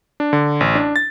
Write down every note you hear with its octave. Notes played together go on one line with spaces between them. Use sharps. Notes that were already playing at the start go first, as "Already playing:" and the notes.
D4
D3
A1
D4
A6